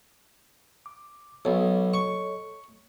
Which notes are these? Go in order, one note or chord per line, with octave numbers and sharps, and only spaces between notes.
D6
B1 A4 C#5 D#5
C#6